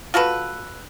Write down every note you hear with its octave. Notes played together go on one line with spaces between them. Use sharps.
F4 F#4 A4 B4